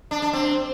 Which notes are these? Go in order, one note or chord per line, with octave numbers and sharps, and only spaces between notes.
D4
D4
C4